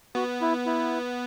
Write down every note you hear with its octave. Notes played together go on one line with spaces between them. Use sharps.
B3 F#4
E4
E4